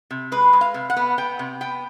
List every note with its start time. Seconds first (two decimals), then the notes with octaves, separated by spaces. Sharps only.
0.11 C3
0.32 G#3 B4
0.53 G#3
0.61 F5
0.74 C3
0.90 F#5
0.97 B3
1.18 B3 G5
1.39 C3
1.61 B3 G5